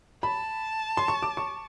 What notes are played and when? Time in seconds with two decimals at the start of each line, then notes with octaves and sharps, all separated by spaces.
0.23 A5 B5
0.97 C6
1.08 C#6
1.23 D6
1.37 C#6